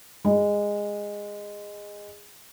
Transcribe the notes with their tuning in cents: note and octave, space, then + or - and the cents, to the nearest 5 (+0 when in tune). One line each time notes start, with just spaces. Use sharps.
G#3 -15